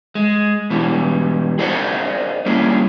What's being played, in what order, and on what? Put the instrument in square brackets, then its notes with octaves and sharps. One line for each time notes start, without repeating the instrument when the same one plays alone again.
[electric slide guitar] G#3
B2 E3 G3
G#4 A#4 C5 D5 D#5 F#5
G3 A#3 C#4 E4 G#4